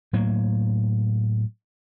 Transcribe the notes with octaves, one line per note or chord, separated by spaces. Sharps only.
A2 F#3 A#3